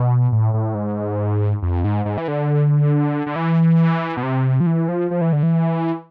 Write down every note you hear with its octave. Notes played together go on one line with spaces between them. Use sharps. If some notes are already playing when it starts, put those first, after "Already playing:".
Already playing: B2
A2
A2
G#2
F2
G#2
G#2
E3
D3
D3
E3
B2
C3
F3
E3
F3
F3
E3
D3
E3